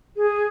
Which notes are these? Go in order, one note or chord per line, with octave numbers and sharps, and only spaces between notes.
G#4